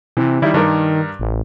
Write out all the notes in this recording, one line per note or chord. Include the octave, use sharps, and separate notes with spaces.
C3 E3
D#3 G3 E4
G2 D#3 A#4
A1